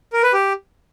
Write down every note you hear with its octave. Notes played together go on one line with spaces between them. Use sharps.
A#4
B4
G4